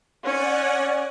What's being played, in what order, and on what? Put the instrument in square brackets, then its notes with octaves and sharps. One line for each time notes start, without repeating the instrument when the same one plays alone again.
[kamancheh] C#4 [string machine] D5 F#5 G#5